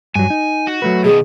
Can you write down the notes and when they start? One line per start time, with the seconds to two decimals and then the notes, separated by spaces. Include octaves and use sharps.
0.15 G2 F#3 G#5
0.30 D#4
0.67 F#4
0.82 F#3 A3 B4
1.04 B2 D#3 G#4